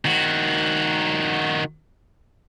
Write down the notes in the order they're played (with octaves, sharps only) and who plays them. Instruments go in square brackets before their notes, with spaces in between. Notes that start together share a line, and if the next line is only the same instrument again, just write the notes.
[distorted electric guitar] D#3 F#4